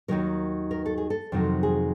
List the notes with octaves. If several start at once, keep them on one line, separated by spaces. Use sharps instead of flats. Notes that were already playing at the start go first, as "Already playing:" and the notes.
D#2 D#3 F#3 A#4
A#4
A4
G#4
A4
F2 C3 D#3 F#3
G#4